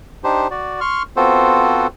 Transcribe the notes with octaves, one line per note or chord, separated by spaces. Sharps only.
D4 D#4 G4 C5
F#4 D5
C6 C#6 F6
B3 C4 F4 F#4 A4 C5